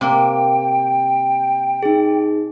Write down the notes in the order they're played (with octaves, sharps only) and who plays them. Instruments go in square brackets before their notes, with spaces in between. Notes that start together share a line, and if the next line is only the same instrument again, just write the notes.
[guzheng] C3 A#3 [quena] G5
[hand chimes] D#4 G#4